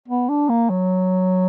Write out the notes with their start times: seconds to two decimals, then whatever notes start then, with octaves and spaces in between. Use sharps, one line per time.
0.08 B3
0.29 D4
0.49 A#3
0.70 F#3